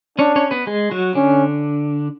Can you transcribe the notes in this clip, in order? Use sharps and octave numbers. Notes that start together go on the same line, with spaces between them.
C#4 D4 C#5
C#4 C#5
B3 B4
G#3 G#4
F#3 F#4
D3 C#4 D4